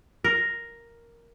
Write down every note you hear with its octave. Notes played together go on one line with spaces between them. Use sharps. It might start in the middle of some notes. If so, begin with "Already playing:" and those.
A#4